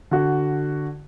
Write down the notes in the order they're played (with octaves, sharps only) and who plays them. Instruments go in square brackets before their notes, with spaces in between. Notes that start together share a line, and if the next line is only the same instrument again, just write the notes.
[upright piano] D3 F#4